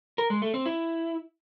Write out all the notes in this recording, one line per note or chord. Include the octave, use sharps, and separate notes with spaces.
A#4
G#3
A3
C4
E4